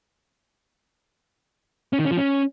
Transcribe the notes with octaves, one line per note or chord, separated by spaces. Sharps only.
C#4
D#3
C#4
F3
C#4